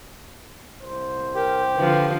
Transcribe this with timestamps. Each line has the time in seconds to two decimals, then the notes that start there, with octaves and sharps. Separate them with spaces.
0.82 C2 C5
1.35 G4 A#4
1.76 D3 F3 B4